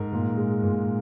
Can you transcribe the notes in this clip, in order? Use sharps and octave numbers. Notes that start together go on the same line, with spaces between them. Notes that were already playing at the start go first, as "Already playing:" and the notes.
Already playing: G#2 A#4
A#2
G#3
A#2